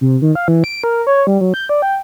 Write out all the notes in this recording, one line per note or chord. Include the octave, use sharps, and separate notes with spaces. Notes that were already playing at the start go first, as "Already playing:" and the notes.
C3
D#3
F5
E3
D7
A#4
C#5
G3
F#3
G6
D5
G5